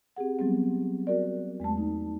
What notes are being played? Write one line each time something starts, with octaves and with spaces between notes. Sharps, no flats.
C4 G4 G#4 F#5
F#3 G3 B3 C4
F#4 A#4 D5
E2 G#3 A3 A5
D#4